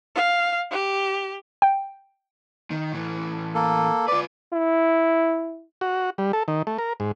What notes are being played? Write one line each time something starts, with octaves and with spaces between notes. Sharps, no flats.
F5
G4
G5
D#3
A2 E3
A#3 A4
F4 B4 D5
E4
F#4
G3
A4
D#3
A3
A#4
G#2